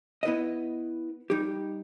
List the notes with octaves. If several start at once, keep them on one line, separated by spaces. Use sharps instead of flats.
B3 E4 B4 D#5
G3 D#4 G4